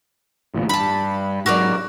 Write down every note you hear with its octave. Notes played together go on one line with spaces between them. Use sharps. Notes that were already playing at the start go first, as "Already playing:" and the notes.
A1 D2 A#2
G2 A5 B5
G#2 F#3 F#4 A#4 D5